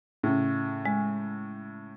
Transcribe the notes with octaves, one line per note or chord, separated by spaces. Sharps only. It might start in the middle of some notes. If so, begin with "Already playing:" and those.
A2 C#3
G#3